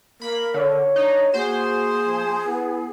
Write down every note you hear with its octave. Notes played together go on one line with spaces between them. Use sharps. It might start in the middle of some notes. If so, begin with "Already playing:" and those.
A#3 A#4 B5
D3 C#5
D4 D#4
A#3 F#4 G#4 C5
F3
B3 E4